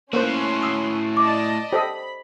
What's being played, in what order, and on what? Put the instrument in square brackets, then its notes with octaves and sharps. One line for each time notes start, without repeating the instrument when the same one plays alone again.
[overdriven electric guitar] A2 F#4 [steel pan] A#3 C5 [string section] C#4 C6 [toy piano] B4
[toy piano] D#6 E6
[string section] D5 D#5 A5 [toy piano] D6
[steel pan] G4 A4 D#5 [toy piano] C5 [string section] B5